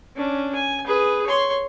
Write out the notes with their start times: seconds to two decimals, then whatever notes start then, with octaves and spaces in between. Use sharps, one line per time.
0.16 C#4 D4
0.55 G#5
0.87 G#4 B4
1.26 C#5 C6